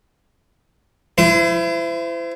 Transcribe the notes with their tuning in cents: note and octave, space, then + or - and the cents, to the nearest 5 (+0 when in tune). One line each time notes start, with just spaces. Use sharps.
E4 +30 C5 -35